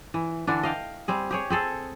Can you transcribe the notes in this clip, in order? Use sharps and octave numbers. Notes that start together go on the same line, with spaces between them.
E3
D3 E3 D4
D#5 F5 G5
G3 C4 G#4
G4 G#4 C#5
C4 G#4 A4